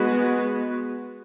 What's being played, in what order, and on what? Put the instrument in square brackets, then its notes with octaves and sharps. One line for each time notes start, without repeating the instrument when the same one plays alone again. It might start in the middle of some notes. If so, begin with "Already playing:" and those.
Already playing: [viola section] G#3 B3 F#4 B4